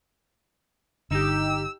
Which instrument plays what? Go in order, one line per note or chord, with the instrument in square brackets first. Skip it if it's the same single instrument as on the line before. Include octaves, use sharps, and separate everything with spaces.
[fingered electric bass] G1 D3 [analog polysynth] D#4 G4 [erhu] E6